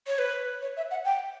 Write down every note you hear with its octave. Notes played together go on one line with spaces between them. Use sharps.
C#5
B4
C#5
E5
F#5
G5